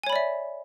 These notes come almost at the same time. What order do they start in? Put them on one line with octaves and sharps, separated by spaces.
G#5 C#5 B5 D5 E5